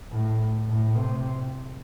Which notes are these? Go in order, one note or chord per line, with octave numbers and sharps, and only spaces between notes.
A2
A2
C3